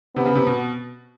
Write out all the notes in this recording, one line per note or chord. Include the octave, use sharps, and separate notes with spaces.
C3 B3
C#3
C3
B2